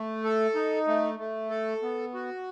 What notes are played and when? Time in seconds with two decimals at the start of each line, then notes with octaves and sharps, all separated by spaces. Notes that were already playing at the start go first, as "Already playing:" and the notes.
Already playing: A3
0.24 A4
0.55 D#4
0.87 A3
1.19 A3
1.50 A4
1.82 B3
2.14 F#4